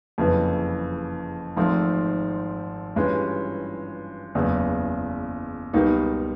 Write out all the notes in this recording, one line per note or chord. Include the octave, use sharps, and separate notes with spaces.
F#1 F2 C#3 E3
G#1 G#2 F3 A3 C4
G2 E3 G#3 C#4 F4
F#1 E2 C#3
C#2 B2 G3 A#3 D#4